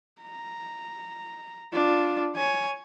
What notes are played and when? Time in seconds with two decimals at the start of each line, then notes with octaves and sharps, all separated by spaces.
0.21 A#5
1.73 D4 F4
2.35 C#5 G#5